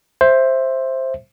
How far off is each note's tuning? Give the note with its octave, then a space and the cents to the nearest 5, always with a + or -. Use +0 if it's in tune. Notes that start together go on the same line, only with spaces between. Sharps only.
C5 +10 E5 +0